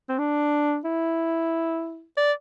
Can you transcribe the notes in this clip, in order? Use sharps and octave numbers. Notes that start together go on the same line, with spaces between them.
C4
D4
E4
D5